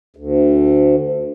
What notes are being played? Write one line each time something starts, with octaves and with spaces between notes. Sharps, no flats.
D2